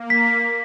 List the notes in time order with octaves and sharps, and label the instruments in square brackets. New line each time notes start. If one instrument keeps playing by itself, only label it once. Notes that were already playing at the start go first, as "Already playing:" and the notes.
Already playing: [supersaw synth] A#3
[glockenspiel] B6